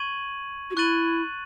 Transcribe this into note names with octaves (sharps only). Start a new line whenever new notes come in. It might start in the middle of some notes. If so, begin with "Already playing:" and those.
Already playing: C#6 G#6 D#7 F#7
F#4
E4 C#6 F#6 A6 D#7 F#7